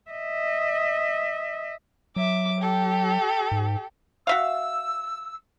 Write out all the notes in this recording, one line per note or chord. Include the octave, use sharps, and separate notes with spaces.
D#5 E5
F#3 E5 D6
G4 A4
G#2
F#4 E5 F5 E6